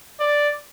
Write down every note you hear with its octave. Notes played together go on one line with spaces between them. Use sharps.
D5